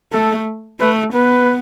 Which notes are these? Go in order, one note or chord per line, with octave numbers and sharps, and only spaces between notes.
A3 A4
A3 B4
B3 B4